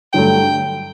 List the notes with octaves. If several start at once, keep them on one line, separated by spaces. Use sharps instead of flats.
G2 D3 F#3 A3 G5